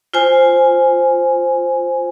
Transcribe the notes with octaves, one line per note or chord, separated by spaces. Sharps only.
F4 C5 G#5